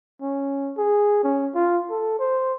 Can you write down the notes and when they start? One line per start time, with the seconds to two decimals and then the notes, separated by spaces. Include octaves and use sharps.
0.22 C#4
0.78 G#4
1.24 C#4
1.55 F4
1.90 A4
2.19 C5